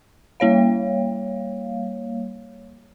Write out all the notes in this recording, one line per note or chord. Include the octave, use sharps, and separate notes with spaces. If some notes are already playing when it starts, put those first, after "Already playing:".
G3 A#3 C#5 F5